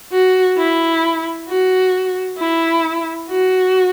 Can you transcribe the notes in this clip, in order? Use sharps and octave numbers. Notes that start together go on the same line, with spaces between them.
F#4
E4
F#4
E4
F#4